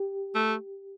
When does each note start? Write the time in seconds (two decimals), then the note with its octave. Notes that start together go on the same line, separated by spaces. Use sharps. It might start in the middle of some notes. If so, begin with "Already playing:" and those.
Already playing: G4
0.35 A3